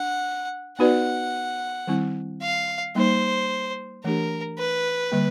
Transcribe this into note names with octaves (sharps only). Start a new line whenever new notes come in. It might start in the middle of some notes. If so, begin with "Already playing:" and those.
Already playing: D4 F#5
B3 D#4 F#4 B4 D5 F#5
D#3 G3 C4 E4
F5
G3 A#3 D#4 C5
E3 A3 D4 G4 A#4
B4
D3 G3 A#3